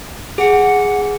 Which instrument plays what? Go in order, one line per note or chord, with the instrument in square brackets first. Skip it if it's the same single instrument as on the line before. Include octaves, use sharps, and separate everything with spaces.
[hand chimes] G#4 [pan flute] F#5